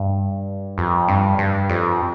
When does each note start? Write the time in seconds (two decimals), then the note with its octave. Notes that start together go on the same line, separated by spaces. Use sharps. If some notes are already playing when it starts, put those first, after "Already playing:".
Already playing: G2
0.78 F2
1.08 G2
1.38 G2
1.69 F2